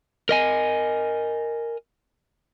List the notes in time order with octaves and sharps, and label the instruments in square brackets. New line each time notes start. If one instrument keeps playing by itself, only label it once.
[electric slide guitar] A#4 D#5 G#5